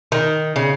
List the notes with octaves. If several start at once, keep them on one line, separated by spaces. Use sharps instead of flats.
D#3
C#3